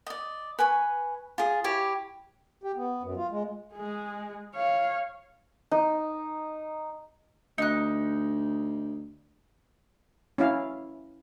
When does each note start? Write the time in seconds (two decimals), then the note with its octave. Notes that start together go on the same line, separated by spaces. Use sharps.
0.07 D5 D#5
0.59 B4 G#5 C#6
1.38 F4 G#4
1.64 E4 G4 C#5
2.64 G4
2.76 B3
3.03 F#2
3.17 F4
3.31 G#3
3.74 G#3 G#4
4.55 C#5 F5
5.71 D#4
7.58 D2 D#4 F#6
10.38 C#4 E4 F5